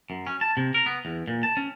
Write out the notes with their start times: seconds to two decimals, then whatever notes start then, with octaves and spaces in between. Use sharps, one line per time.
0.10 F#2
0.27 C#4
0.41 A5
0.57 C3
0.74 A#4
0.86 B3
1.05 E2
1.28 A#2
1.43 A5
1.57 C#4